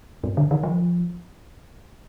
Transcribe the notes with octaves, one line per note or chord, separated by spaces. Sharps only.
G2
D3
D#3
F3